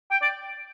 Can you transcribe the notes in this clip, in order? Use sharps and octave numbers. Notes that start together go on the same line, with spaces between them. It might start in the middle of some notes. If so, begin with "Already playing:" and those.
G5
D5